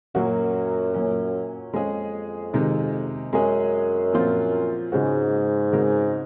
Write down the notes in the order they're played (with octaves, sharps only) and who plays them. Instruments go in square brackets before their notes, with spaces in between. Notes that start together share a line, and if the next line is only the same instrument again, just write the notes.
[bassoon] F#2 [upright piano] A#2 F#3 A#3 C#4 F#4
[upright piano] A#2 F#3 C#4
[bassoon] F2 [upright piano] G#3 C#4 G#4
[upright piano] C3 D#3 G#3 D#4
[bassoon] F#2 [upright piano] G#3 C#4 G#4
[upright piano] A#2 F3 C4 F4
[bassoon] G#2 [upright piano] C#3 G#3 C#4 F#4
[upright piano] C#3 G#3 C4 F#4 A#4